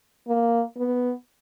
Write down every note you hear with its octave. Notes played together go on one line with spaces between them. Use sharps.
A#3
B3